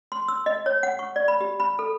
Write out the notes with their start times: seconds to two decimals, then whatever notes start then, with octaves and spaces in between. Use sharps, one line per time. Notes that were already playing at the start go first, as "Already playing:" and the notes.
0.12 C6
0.28 E6
0.46 D#5
0.66 C#5
0.83 F#5
0.99 C#6
1.16 D5
1.28 B5
1.41 G4
1.60 B5
1.79 A4